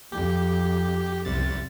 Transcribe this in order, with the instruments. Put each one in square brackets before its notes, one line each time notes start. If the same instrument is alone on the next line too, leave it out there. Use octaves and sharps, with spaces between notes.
[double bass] F2 [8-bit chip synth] G4
[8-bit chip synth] C2 C3 A6